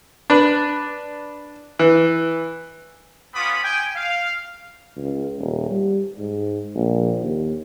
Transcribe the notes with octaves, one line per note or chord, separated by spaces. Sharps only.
D4 B4
E3
B3 C#4 F4 B5 D6 D#6
G5 G#5
F5
C#2
D#1
G3
G#2
A#1
D#2